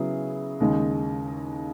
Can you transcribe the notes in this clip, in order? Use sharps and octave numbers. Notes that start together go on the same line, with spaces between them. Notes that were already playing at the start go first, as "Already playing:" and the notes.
Already playing: C#3 F#3 B3 E4 G#4
D#2 C#3 G#3